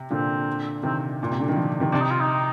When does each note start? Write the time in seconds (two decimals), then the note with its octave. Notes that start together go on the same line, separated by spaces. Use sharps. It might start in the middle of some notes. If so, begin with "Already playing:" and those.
Already playing: C3
0.10 A#2 D3 C4
0.83 C3 D#3 C4
1.23 A#2
1.31 C3
1.40 D3
1.49 D#3
1.56 D3 F3
1.80 C3 D#3
1.92 C3 D4
2.02 D#4
2.11 F4
2.20 D#4